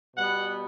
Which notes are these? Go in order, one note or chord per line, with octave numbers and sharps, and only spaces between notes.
B2 G3 B3 F#5